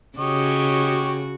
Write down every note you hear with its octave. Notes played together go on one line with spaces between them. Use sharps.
C#3 F#4 G4 C#5 D#5